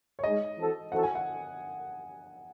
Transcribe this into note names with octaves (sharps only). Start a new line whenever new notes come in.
C#5
G#3 D#4 G#4 D#5
E3 C4 F#4 A4
E3 C4 D#4 F#4 A4 F#5
G#5
F#5